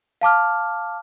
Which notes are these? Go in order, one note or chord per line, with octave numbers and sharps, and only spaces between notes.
F5 A5 D6 F6